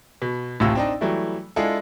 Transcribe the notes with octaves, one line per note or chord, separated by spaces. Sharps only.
B2
A1 D2 A2 C3 F4 E6
C4 D4 D#4
E3 F#3 G3 A3 E4
G#3 D4 E4 F4 G#4 A4